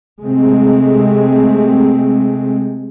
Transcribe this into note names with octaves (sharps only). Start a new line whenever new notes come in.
C3 G#3 A3 C4